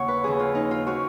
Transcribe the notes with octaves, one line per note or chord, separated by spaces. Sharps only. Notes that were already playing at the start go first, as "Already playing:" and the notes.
Already playing: D#2 C#3 C#5 F#5
B4
D#2 C#3 F3 G#4
F4
D#4
F4
F3 F#4